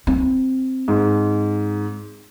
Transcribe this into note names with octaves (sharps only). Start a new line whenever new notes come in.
C4
G#2